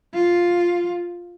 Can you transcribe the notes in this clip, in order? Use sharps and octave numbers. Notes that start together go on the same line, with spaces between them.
F4